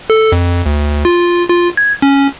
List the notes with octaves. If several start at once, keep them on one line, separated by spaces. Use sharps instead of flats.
A4
F2
D2
F4
F4
G#6
C#4